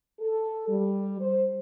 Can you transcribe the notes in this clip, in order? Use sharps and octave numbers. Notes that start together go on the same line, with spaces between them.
A4
G3
C5